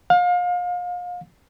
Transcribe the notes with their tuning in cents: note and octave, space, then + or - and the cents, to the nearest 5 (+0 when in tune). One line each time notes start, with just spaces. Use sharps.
F5 +35